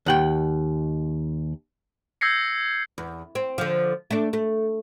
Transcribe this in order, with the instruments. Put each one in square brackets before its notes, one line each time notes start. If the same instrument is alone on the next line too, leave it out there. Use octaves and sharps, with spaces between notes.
[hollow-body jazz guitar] D#2 F#5 G5
[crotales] E6 G6 G#6 A#6 C7 C#7
[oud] E2
C4
D3 F3
A3 D4
A3